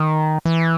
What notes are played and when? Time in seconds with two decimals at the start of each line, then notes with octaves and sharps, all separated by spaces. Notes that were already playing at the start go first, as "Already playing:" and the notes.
Already playing: D#3
0.45 E3